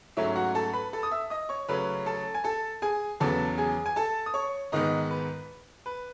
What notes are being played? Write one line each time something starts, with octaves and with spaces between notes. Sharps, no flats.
G#2 F#3 A3 C#4 E4 E5
F#4 F#5
A4 A5
B4 B5
A4 A5
D#6
E5 E6
D#5 D#6
C#5 C#6
C#3 F#3 A3 C#4 B4 B5
A4 A5
G#5
A4 A5
G#4 G#5
E2 C#3 F#3 B3 A4 A5
G#4 G#5
G#5
A4 A5
D#6
C#5 C#6
G#2 D#3 G#3 B3 D#4 D#5
B4
B4